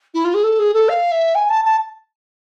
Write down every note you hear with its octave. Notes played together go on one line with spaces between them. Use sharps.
E4
F4
G#4
A4
G#4
A4
F5
E5
G#5
A5
A5